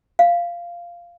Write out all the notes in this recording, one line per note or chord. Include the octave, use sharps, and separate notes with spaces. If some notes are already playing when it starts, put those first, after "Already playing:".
F5